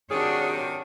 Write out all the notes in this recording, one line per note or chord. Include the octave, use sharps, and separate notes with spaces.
C3 D#3 D4 F#4 G#4 C#5